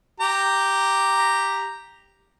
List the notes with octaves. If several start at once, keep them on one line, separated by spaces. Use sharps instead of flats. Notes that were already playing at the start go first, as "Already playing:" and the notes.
G4 A#5